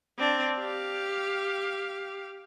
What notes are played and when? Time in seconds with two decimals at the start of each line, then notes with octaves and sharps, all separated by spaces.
0.18 C4 D4
0.58 G4 F5